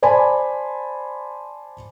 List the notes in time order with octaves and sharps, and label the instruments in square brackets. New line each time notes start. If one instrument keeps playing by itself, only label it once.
[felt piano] C5 D5 G#5 A5 B5